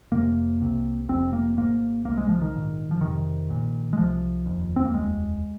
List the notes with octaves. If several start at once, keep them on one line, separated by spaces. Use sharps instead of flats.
F1 F2 C3 A#3
C2 C3
F1 F2 C3 C4
A#3
G#1 G#2 A#3
C2 C3 A#3
G#3
F3
D#3
A#1 G#2
F3
F1 F2 C3 D#3
A#1 A#2
G#3
C2 C3 F3
F1 D#2
C4
A#3
F1 D#2 G#3